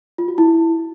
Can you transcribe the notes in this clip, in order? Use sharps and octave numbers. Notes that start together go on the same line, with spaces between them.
F4
F#4
E4